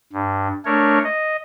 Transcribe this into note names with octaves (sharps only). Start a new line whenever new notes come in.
G2
A3 D4 A#4 C#5
D#5